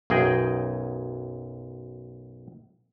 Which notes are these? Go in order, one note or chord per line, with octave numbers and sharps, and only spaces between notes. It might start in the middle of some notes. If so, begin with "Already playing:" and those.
B1 F#2 G#4 D#5 G5